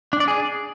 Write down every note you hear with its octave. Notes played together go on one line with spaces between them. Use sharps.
D4
D5
G#4